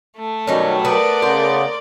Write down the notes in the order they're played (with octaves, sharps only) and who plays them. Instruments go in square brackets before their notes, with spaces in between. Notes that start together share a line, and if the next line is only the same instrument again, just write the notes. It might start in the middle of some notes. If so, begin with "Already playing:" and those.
[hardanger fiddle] A3
[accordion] B2 F#3 G3 [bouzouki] D#3 C#4
[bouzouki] B3 [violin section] A#4 D5
[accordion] C#3 B3 [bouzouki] C5